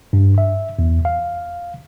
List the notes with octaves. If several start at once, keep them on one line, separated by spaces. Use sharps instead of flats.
G2
E5
E2
F5